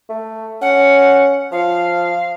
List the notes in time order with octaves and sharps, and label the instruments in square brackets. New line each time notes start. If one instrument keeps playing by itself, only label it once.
[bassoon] A3
[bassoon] C#4 [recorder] F#5
[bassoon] F3 [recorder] F5